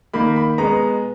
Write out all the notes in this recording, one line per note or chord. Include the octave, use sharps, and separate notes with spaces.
D#3 A#3 B5
B5
B2 G#3 B3 A#5